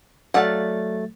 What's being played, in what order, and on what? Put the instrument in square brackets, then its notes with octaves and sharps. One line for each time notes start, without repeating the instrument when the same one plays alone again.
[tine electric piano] F#3 A3 A6 [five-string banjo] D5 F5 F#5